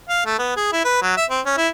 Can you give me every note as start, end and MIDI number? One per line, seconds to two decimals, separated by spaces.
0.09 0.25 77
0.26 0.38 57
0.39 0.55 59
0.57 0.71 68
0.72 0.82 64
0.85 0.98 71
1.02 1.12 54
1.17 1.25 76
1.30 1.41 60
1.46 1.55 61
1.58 1.68 64